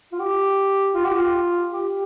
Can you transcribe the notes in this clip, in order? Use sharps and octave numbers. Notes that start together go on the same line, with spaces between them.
F4
G4
F4
G4
F4
G4